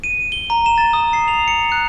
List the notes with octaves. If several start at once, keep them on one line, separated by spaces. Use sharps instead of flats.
D#7
G7
A#5
E7
A6
D#6
C7
F7
C#7
F#6